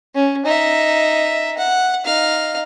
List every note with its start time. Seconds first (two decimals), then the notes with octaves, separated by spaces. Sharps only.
0.15 C#4
0.45 D#4 E5
1.58 F#5
2.06 D#4 F5